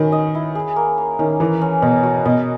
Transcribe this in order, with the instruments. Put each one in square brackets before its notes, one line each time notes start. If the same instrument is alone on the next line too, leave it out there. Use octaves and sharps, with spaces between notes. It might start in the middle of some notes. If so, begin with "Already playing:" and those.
Already playing: [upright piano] D#3 [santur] C#4 F#4 B4
[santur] D#5
E4
G#4
A#3
A#3
[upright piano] D#3 [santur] C#4
[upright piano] E3 [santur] A#4
[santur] C#4
[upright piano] B2 [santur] C#4
[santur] F#4
[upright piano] B2 [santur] D#5